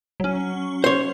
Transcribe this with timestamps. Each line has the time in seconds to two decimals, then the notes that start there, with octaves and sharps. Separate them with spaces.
0.20 F#3 C#4
0.84 C5 C#5